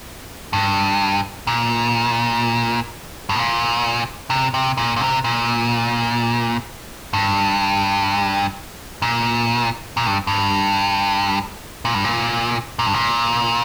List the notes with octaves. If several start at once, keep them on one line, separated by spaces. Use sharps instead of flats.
G2
A#2
G2
A#2
C3
C3
A#2
A#2
C3
A#2
G2
A#2
A#2
G2
G2
A#2
G2
A#2
A#2
G2
A#2